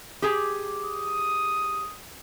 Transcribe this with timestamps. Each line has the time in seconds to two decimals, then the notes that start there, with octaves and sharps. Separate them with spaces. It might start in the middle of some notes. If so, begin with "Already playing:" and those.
0.22 G4 G#4
0.85 D#6